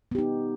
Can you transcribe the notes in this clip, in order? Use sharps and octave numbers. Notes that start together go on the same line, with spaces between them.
B3 D#4 G4